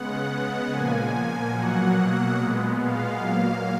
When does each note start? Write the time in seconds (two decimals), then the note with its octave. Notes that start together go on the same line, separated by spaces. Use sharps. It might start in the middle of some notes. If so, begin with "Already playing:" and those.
Already playing: C#3 G#3 B3 F#5
0.70 A#2 F3 A#3 G#5
1.53 B2 F#3 A#3 F#5
2.36 A#2 G#3 B3
2.77 F5
3.19 A#2 F#3 A#3